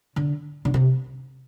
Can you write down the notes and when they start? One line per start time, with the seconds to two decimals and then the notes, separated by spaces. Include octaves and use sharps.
0.16 D3
0.65 D3
0.74 C3